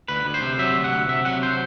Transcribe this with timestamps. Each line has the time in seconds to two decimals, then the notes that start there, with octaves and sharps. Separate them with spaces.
0.08 D2 B4
0.25 D2
0.34 C5
0.42 C3
0.58 F#3 E5
0.76 D2
0.84 F#5
0.93 D2
1.08 C3 E5
1.25 F#3 F#5
1.43 C5